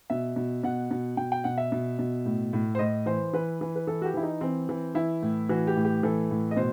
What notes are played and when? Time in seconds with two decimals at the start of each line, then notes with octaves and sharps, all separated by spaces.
0.10 B2 E5
0.36 B2
0.63 B2 F#5
0.91 B2
1.17 B2 G5
1.32 G5
1.44 B2 F#5
1.58 E5
1.72 B2
1.99 B2
2.25 A2
2.53 A2
2.75 C5
2.79 A2 D#5
3.06 E3 C5
3.33 E3 B4
3.61 E3
3.76 B4
3.87 E3 A4
4.02 F#4
4.05 G4
4.14 E3 E4
4.23 D#4
4.41 E3 C4
4.69 E3
4.95 E3 E4
5.22 A2
5.49 E3 F#4
5.67 G4
5.76 A2
5.85 G4
6.03 E3 A4
6.31 A2
6.51 D#5
6.56 B2 C5